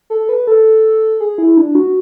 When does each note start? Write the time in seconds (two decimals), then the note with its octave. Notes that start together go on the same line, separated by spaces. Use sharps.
0.10 A4
0.29 B4
0.47 A4
1.20 G#4
1.38 E4
1.57 D4
1.75 F#4